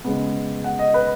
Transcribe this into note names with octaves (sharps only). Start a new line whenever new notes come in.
C#3 G#3 B3
F#5
D#5
B4